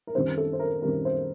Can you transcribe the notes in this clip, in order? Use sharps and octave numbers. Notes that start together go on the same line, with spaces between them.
A#4
F#2 D#3 G3 C4 C5
A4
C5
A#4
F#2 D#3 G3 C4 A#4
C5